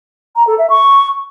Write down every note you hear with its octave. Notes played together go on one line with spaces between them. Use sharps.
A#5
A4
E5
C#6